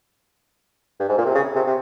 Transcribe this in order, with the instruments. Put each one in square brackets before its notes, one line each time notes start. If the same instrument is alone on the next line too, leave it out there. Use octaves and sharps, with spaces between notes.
[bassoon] G2
G#2
A#2
C3
C#3
C3
C3